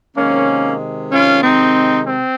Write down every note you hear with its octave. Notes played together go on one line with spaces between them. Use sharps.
C3 D#3 G#3 A#3 C#4
C#4 F4
C4 D#4
C4